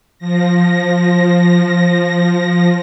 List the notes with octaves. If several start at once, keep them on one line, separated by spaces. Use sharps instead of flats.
F3 A#6